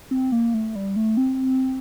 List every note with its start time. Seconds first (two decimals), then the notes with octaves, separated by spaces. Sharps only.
0.11 C4
0.32 A#3
0.54 A3
0.75 G3
0.96 A3
1.17 C4